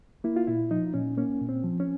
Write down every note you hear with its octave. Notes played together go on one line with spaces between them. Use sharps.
A#3 E4
F4
A#2 E4
F3 D#4
A#2 C#4
A#3 C#4
A#2
C4
F3
C#4